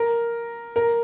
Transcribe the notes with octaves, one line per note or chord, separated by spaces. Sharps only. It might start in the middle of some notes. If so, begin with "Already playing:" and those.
Already playing: A#4
A#4